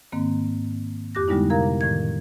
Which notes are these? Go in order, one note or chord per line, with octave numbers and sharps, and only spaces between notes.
G#2 D#3 A#3 C4
F2 G4 D6 F#6 A#6
D3 G3 G#3 B3 D#4 E4
C3 A#4 F5 A#5 G#6
A2 D#3 G#6